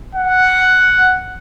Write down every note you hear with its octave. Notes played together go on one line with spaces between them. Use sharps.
F#5